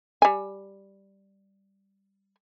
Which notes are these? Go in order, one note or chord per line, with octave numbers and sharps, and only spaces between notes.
G3 G#5